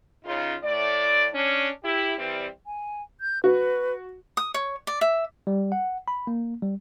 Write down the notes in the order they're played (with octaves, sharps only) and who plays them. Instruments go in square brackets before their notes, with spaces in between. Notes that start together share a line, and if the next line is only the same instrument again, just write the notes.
[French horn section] C#3 D#4 F4
A2 D5
C#4 D4
E4 G4
E3 G3 C4
[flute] G#5
G6
[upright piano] F#4 [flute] B4
[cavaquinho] D#6
C#5
D5
E5
[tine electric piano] G3
F#5
B5
A#3
G3